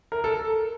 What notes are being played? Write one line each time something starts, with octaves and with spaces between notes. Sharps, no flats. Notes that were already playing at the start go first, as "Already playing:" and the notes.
A#4
A4